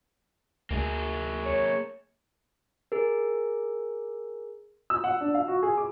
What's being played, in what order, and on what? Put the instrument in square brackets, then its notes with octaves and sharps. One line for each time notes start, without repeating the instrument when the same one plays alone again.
[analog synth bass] D2 [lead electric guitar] A#3 G#4
[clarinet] C#5
[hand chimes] G#4 A#4
[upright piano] E6
F#5
D4
F5
F#4
G#4
D6